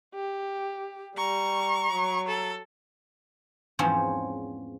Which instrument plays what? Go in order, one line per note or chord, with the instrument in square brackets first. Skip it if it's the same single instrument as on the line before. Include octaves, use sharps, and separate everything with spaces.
[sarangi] G4
[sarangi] G3 [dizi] A#5 [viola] C#6
[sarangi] F#3
[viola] A4
[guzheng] E2 G#2 F3 F#3 C4 C#4